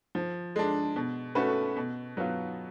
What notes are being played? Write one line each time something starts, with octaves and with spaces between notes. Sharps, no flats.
F3
G#3 D4
B2
A3 C#4 F#4 B4
B2
F#3 B3 F4